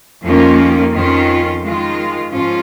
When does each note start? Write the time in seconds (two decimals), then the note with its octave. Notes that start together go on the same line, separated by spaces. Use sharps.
0.24 F2 D#3 A#3 C#4 F4
0.93 F2 D#3 C#4 F4
1.62 D#3 G#3 F4
2.30 G#2 F3 C#4 F4